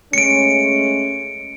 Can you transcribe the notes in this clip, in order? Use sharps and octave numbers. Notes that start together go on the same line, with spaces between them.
G#3 A3 C#4 C#7 D7